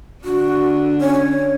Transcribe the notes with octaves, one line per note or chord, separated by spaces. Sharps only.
D3 D4 F#4
C#4 C#5